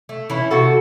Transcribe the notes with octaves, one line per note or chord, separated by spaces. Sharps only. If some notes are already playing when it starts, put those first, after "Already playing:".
A3
E3 C#4 E4
C3 F#4 A4